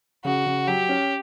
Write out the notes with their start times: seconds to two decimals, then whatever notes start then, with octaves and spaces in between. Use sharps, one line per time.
0.25 C#3 F#4
0.46 C#3
0.67 F#3 G4
0.89 C#4